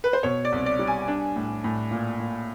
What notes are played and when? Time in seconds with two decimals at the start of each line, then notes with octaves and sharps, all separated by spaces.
0.04 B4
0.13 C5
0.23 B2 C#5
0.45 D5
0.52 C2
0.66 D5
0.79 G3
0.87 G#5
1.08 D4
1.36 A2
1.64 A2
1.91 A#2
2.20 A#2